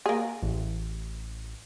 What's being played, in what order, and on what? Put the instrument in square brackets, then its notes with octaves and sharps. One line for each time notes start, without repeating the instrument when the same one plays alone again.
[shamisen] A#3 G#4
[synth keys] A1